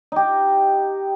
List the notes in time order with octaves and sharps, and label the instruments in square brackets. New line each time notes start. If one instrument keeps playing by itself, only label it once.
[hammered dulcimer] D#4 G4